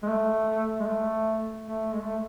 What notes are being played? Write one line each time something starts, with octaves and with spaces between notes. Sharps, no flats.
G#3
A3
G#3
A3
A3
G#3
A3